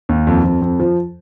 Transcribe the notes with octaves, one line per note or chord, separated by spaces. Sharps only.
D#2
F2
F2
F2
F3